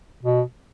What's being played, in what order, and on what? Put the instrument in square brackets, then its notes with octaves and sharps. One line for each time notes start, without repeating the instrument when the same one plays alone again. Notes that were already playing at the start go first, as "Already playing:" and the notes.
[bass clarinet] B2